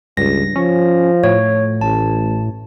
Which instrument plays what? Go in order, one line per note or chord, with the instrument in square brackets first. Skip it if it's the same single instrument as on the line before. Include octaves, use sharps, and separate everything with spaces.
[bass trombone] C#2 [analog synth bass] G2 [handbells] A#6
[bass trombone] F3 [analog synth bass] C#4
[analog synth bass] A2 [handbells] C#5
[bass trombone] A1 [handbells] A5